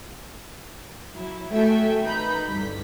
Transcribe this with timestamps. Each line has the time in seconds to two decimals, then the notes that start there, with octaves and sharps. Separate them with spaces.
1.14 F#3 E4
1.51 A3 F#4 A4 E5 G5 G#5
2.02 D#3 D#4 B4 A#5 B5 G6
2.47 C2 G2 D3 G3 B6